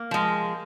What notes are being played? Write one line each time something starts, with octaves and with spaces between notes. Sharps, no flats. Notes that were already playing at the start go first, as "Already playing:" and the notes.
Already playing: A#3
F3 G#3